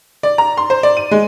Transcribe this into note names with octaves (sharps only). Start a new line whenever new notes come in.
D5
A#5
C6
C5
D5
D#7
G#3